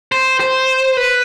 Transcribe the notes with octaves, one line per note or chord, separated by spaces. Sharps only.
C5
C5
B4